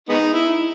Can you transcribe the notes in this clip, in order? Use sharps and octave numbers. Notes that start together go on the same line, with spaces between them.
G#3 B3 D#4
E4